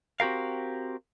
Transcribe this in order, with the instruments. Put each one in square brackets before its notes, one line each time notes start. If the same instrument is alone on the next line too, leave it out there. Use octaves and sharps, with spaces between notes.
[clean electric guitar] C4 F#4 G4 A#4 F5